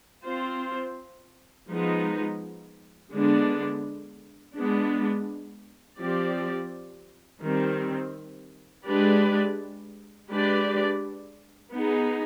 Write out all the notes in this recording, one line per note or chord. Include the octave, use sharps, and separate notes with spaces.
C4 F4 C5
F3 G#3 B3 D#4
D3 G#3 B3 D4
G#3 B3 D4
F3 C4 G4 D5
D#3 G3 C4
G#3 D4 G4 B4 D5
G#3 D4 G4 B4 D5
B3 D#4 G#4